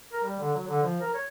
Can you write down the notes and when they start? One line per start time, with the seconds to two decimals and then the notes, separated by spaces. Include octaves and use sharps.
0.13 A#4
0.24 G3
0.39 D3
0.55 F#3
0.67 D3
0.83 F3
1.01 A#4
1.14 C#5